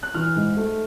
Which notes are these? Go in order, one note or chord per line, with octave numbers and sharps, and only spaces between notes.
F#6
E3 F6
G#2
A3